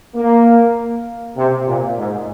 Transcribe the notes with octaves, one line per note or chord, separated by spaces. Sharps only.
A#3
C3
A#2
G#2